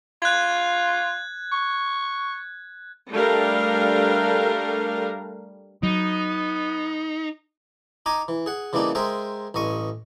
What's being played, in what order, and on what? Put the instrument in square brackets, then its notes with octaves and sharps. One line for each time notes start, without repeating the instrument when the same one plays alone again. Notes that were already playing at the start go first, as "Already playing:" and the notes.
[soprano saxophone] F4 [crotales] F#6 G#6
[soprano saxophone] C#6
[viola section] G3 A3 D4 A#4 F5
[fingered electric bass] F#3 [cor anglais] B3 [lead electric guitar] D#4
[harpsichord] D#4 G#5 A#5 D6
E3
G#4 F#5
C#3 E3 G3 A#3 D4 D#4
G#3 G#4 A#4 C5 E5 G5
A1 G2 D#5 C#6 D#6